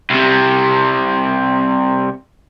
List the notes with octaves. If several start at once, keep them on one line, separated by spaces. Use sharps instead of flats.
C2 C3